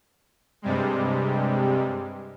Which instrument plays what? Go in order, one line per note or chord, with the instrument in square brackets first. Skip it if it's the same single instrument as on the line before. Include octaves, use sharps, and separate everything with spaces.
[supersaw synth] G2 C3 G3 G#3